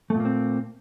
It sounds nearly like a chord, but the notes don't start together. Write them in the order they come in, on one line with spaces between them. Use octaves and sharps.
A3 A#2 A#3 C4